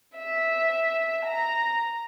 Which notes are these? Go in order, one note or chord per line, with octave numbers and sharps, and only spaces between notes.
E5
A#5